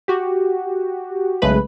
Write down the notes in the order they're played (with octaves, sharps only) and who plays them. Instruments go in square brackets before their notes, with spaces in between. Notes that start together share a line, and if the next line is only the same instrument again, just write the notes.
[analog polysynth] F#4 G4
B1 C#3 G#3 A3 B4 B5